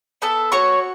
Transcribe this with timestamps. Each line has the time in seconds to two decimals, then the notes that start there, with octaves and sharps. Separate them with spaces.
0.22 B3 A4 A5
0.52 F#4 C#5 C#6